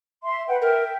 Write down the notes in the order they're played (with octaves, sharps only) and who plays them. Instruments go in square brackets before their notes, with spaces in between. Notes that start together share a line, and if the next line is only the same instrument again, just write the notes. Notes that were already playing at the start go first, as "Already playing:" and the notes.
[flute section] E5 C6
B4 F#5 G5
[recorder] A#4 [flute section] E5 G5